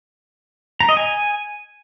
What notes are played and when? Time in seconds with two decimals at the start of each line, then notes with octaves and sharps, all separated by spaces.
0.80 A#5
0.89 D#5
0.97 G#5